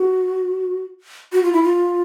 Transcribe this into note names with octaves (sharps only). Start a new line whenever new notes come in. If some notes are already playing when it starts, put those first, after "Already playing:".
Already playing: F#4
F#4
F4
E4
F4